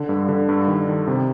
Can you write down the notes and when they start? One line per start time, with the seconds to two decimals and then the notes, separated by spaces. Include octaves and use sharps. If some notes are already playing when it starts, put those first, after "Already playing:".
Already playing: D3
0.09 G2
0.29 D3
0.49 G2
0.68 D#3
0.88 D#3
1.07 C3